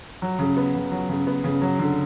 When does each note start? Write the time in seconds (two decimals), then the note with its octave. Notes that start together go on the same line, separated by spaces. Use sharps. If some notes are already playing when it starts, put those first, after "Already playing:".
0.22 F#3
0.39 C#3
0.57 B3
0.75 C#3
0.91 F#3
1.09 C#3
1.27 B3
1.44 C#3
1.62 F#3
1.79 D3